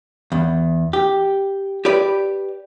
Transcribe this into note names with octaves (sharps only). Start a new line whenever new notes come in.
E2
G4
G4 B4 D5